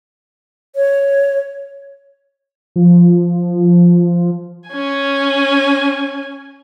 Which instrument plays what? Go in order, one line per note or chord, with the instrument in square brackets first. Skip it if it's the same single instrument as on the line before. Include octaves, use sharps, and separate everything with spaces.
[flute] C#5
[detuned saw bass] F3
[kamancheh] C#4 G#5